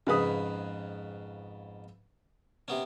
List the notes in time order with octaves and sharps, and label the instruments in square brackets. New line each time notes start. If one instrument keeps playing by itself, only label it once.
[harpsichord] F2 G#2 [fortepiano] C#3 B4 D#6
[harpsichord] C3 B3 C#4